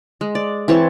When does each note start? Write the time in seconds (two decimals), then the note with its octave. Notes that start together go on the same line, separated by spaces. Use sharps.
0.21 G#3
0.35 D5
0.68 E3 C4 C#5 A5